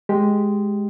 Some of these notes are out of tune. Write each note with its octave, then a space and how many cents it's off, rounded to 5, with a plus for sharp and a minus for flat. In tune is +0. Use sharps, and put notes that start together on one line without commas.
G#3 +0 G4 +0